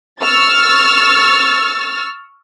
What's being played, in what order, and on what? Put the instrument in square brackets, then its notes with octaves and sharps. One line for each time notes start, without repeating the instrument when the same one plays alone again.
[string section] C#6 E6 F6 A6